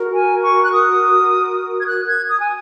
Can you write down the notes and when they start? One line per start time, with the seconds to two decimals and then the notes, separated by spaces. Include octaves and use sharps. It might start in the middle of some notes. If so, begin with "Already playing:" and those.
Already playing: F#4 A#4
0.14 G#5
0.43 C#6
0.63 F#6
0.71 D#6
1.81 G#6
1.86 F#6
2.07 G#6
2.28 D#6
2.39 G#5